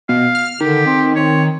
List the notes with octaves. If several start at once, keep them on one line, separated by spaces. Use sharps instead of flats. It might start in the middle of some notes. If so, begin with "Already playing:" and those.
B2 F5
F6
D3 D#3 G4
C4
C4 C#5